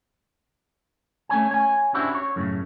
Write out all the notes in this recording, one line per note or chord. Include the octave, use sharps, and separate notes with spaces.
A3 C#4 C#5 G#5
C#5 G#5
C#4 D4 E4 F#4 G4 C5
C#5
F#2 A2 C#3